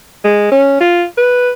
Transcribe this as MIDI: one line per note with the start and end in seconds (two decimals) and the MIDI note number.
0.24 0.51 56
0.52 0.78 61
0.80 1.05 65
1.17 1.51 71